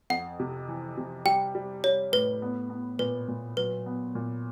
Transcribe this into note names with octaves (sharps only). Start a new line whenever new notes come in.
F2 F#5
C3
E3
C3
G3 G5
G3
G3 C#5
A2 B4
B3
B3
A#2 B4
A#2
F#3 B4
B3
A#2